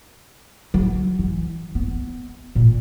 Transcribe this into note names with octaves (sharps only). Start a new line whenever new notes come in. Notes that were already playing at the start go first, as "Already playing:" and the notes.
F#3
E3
B3
A#2